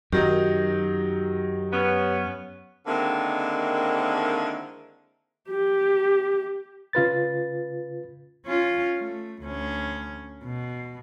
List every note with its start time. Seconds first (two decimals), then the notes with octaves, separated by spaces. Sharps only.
0.12 F#2 D#3 F#3 D#4 G4
1.72 B3 C#4
2.86 D3 D#3 G#3 A#3 C4 E4
5.49 G4
6.93 C#3 F4 B4 A6
8.46 C#4 F4
8.97 A3
9.42 D2 C#4
10.44 B2